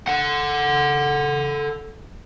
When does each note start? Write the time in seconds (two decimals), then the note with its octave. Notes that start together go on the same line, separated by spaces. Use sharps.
0.08 A4 F#5